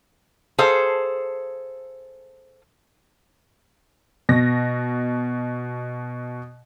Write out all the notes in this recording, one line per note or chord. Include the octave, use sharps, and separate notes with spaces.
G#4 A4 C5 F5
B2 A#6